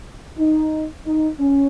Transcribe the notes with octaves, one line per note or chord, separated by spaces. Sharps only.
D#4
D#4
C#4